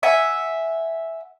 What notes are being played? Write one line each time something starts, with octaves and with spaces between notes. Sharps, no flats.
E5 F#5 G#5